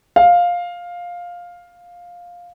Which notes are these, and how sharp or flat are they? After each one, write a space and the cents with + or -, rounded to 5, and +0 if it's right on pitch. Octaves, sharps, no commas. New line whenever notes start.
F5 +10